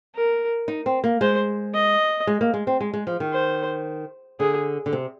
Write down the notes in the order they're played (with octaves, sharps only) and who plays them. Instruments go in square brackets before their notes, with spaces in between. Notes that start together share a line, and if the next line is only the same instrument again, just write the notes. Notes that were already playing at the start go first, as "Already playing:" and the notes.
[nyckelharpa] A#4
[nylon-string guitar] D#4
C4
A#3
[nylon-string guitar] G#3 [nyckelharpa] C5
[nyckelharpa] D#5
[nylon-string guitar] G#3
A#3
G#3
C4
G#3
G#3
F3
D#3
[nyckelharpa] C5
[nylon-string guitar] D3 [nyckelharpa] G#4
[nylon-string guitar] D3
C3